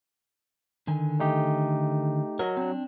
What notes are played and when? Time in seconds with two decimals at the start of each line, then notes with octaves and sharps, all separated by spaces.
0.87 D3 D#3 G#5
1.19 A3 D#4 G4
2.39 F#3 A#4 D#5
2.57 C4 D4